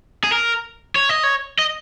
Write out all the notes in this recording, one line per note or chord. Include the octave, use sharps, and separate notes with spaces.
G#4
A#4
C#5
D#5
C#5
D#5